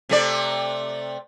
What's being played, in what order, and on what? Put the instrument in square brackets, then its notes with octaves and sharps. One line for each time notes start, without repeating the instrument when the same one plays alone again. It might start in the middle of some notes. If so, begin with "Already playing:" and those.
[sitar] C3 A3 D5